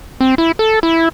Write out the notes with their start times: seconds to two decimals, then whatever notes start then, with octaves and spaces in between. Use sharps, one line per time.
0.21 C4
0.38 E4
0.59 A4
0.83 E4